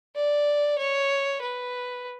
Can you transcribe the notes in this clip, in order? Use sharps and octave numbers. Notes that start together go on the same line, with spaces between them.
D5
C#5
B4